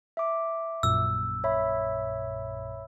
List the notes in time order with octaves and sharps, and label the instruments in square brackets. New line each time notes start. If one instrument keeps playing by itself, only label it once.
[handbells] E5 D6
[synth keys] A#1 F#2 A#2 [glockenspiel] E6
[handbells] C#5 E5 B5